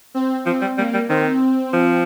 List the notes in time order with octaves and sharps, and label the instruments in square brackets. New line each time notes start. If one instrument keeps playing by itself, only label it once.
[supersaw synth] C4
[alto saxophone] F3 [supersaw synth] C4
[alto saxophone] G3
[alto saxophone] G3 [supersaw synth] A#3
[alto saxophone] G3
[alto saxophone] D#3 [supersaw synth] C4
[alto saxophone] F3